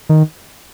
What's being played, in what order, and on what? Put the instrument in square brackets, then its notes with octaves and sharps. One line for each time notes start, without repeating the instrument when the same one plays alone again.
[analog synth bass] D#3